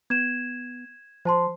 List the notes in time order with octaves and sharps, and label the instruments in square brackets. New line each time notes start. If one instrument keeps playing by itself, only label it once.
[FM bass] B3 [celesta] G#6 E7
[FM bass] F3 [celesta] C5 A5 C6